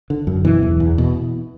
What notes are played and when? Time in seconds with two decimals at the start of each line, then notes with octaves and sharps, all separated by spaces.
0.10 D3
0.27 F#2
0.45 B2 E3
0.63 E2
0.80 E2
0.98 B2